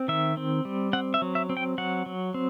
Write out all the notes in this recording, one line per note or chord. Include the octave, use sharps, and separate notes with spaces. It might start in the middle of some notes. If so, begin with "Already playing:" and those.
Already playing: C4
D#3 E5
C4
G3
C4 F#5
E5
F#3
E5
C4
G5
F#3 F#5
F#3
C4